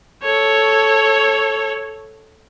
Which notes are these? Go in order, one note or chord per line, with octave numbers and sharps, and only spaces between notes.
A4 C#5